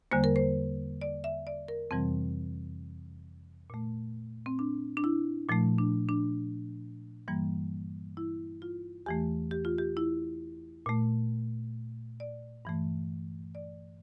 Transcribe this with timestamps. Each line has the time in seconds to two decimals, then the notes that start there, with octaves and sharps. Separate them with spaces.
0.12 E2 D3 G3 A#3 C5
0.24 A#4
0.36 C5
1.01 D5
1.24 E5
1.47 D5
1.68 A#4
1.91 F2 C3 E3 G3 C4
3.70 A#2 A3
4.46 C4
4.59 D4
4.97 D4
5.04 E4
5.49 A#2 F3 A3
5.78 D4
6.09 D4
7.28 G2 E3 G3 A#3
8.17 E4
8.62 F4
9.06 E2 E3 A3 G4
9.51 G4
9.65 F4
9.78 G4
9.97 E4
10.86 A#2 A3
12.20 D5
12.65 G2 E3 A3
13.55 D5